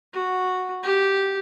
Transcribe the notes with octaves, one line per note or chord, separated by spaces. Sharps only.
F#4
G4